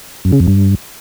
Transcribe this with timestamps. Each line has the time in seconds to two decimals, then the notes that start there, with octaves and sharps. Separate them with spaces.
0.25 F#2
0.32 C#3
0.40 F2
0.48 G2